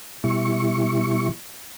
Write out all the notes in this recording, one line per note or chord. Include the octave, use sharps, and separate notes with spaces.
B2 G3 E4 C#6